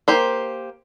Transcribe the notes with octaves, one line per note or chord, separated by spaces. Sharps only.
A#3 G4 C5